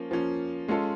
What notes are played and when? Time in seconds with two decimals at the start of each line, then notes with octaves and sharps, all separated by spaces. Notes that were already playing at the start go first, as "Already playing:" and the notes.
Already playing: F3 A#3 C#4
0.11 F3 A#3 C#4
0.68 G#3 C#4 F4 A4